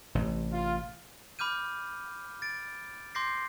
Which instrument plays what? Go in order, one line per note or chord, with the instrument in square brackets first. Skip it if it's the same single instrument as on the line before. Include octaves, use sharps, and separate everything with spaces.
[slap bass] A1 C3
[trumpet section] F4
[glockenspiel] B5 D6 F6 G6 D#7
A6 D7
C6 D6 G6 A#6 C7